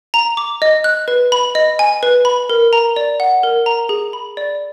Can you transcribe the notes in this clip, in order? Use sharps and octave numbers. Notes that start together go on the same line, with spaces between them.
A#5
D6
D#5
F#6
B4
B5
D#5
G#5
B4
B5
A#4
A#5
D5
F#5
A#4
A#5
G#4
B5
D5